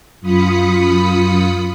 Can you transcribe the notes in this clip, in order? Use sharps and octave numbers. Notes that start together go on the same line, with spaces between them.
F#2 F4 B5 D#6 B6 C#7